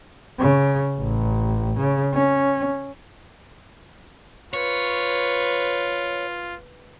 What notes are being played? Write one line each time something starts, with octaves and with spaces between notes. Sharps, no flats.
C#3
A1
C#3
C#4
F4 B4 C#5